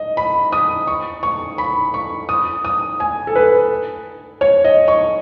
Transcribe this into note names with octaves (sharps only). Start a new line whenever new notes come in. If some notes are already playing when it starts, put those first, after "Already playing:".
Already playing: D#5
B5
D#6
C#6
C#6
B5
C#6
D#6
D#6
G#5
A4
B4
C#5
D#5
C#6